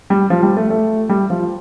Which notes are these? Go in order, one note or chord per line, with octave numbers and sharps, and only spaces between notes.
G3
F3
G3
A3
A3
G3
F3